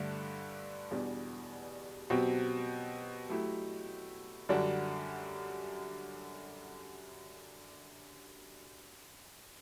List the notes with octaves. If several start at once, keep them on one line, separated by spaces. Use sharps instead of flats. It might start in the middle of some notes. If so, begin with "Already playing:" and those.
Already playing: G2 D3 A3 D4
E2 B2 G3 D4
B2 F#3 C4 G4
F#3 A3 E4 G4
F#2 D3 G3 D4 F#4